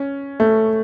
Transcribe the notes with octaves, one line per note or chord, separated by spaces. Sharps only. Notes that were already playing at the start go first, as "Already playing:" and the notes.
Already playing: C#4
A3